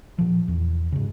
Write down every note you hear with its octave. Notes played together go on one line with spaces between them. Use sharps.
A#2 F3
E2
G#2 C#3